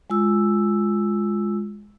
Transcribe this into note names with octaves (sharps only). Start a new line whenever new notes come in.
G#3 F4 E6